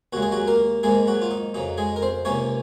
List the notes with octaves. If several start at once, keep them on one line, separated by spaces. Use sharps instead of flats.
D#2 C#3 G#3 F#4
G#4
F#3 F#4
A#3 A#4
G#2 D#3 G#3 A#3 G#4
F#3 F#4
F4
D#4
F2 C#3 F#3 D#4
G#3 G#4
A#4
C4 C5
C#2 C3 D#3 A#3 C#4 C#5